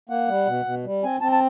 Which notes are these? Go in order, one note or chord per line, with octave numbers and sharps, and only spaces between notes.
A#3 F#5
G3
B2
B2
G3
C4 G#5
C4 A5
A5